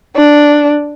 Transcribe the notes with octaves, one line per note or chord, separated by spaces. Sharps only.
D4